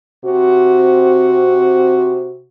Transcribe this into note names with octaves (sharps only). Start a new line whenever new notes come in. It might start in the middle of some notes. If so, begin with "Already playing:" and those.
C3 C4 F#4